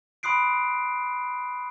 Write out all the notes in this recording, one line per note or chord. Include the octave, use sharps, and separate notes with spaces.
B5 C6 D#6 F#6 C7 D7